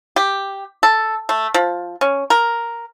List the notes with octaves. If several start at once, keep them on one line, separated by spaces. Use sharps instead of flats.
G4
A4
A3
F3
C#4
A#4